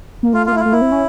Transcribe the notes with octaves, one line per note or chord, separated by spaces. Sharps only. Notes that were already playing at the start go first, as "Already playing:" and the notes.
A#3
A3 F4
A#3 F4
A3 E4
F4
A3
A#3 E4
C4
C#4